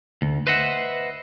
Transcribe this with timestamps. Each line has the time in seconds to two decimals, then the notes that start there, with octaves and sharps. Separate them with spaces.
0.22 D2
0.47 B4 C5 D#5 E5 F#5